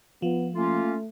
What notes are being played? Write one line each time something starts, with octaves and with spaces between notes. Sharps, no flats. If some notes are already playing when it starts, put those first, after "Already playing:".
F3 B3
A3 A#3 C#4 F4